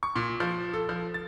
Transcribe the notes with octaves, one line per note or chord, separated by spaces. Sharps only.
C#6
A#2
F3
A4
F3
A6